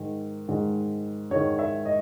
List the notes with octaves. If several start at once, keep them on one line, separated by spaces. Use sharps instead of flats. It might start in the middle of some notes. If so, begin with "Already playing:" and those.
Already playing: G#2 D#3
G#2 D#3
G#2 D#3 C#5
E5
D#5